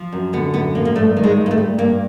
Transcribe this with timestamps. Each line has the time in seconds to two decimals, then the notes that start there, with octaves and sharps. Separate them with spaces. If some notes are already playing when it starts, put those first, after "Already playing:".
Already playing: F3
0.13 F#2
0.33 D3 B3
0.54 F#2 B3
0.75 F3 A#3
0.85 A#3
0.95 G2 A3
1.17 D#3
1.23 G#3
1.37 G2
1.46 A#3
1.51 A3
1.58 G3
1.78 G2 A#3